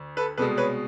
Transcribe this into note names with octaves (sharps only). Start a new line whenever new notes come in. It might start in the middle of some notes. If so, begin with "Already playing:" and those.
Already playing: D2
A4 B4
C2 B2 G#3 A4 B4
B4 C#5